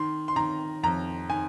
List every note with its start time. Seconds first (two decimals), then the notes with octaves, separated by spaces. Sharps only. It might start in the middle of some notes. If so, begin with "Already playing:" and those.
Already playing: D#3 C6
0.28 C6
0.36 D#3 A#5
0.83 F2 A#5
1.30 D#3 G#5